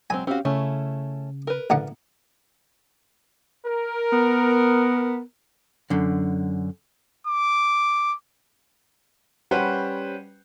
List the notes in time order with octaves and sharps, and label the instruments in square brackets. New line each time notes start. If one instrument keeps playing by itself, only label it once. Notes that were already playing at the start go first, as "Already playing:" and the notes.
[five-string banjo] F#3 G#3 C4 [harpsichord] G#5
[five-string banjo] C4 F#4 [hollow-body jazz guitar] C#4 G4 F5
[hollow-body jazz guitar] C#3 [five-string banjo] A3 C#4 E4
[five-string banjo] A#4 B4
[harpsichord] A1 D3 F#5
[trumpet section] A#4
[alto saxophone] B3
[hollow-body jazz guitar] F#2 D3
[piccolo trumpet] D6
[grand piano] G3 C#4 B4 C5 F#5 G5